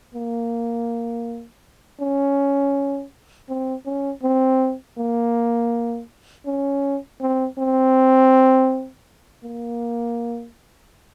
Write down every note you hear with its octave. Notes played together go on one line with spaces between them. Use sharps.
A#3
C#4
C4
C#4
C4
A#3
C#4
C4
C4
A#3